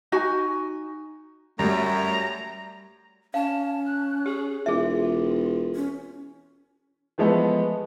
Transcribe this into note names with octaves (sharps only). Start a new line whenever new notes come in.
D#4 F#4 G#5
F#2 G3 A3 A#5
C#4 F5 A5
F#6
G4 G#4
E1 F4 G#4 E5
C#4
E3 F3 G#3 A3 B3 B4